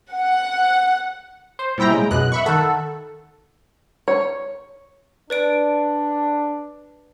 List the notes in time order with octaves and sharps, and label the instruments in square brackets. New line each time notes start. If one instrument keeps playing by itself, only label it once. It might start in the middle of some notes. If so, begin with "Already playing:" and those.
[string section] F#5
[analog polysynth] C5
A#2 G3 E4 G5 A#5
C#3 G#3
F#2 B2 D#5 F#6
E5 B5 C#6
D#3 A4 F#5
[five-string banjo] C#5
[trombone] D4 [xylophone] B4 D5 D7